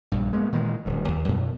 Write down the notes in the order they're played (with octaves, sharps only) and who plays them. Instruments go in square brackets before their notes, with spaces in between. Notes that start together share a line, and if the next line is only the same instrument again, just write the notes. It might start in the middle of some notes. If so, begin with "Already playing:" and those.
[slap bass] A#1 G2
G#3 A#3 B3
A#2 D#3 E3 G#3
D1 G2
D#2
F#2 B2